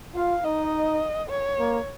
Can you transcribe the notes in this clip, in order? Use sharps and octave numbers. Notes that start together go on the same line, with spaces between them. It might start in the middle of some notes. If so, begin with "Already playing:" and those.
F4 F5
D#4 D#5
C#5
A#3